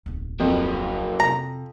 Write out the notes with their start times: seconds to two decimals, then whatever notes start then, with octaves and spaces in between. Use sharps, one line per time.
0.06 D1 B1
0.40 F2 F#3 A#3
1.20 C3 A#5